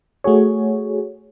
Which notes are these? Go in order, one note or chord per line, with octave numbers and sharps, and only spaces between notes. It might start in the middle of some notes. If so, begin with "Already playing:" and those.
A3 F#4 G#4 C#5